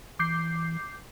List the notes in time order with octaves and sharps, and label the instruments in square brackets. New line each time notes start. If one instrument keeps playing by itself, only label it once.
[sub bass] E3 [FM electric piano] D6 G6 C7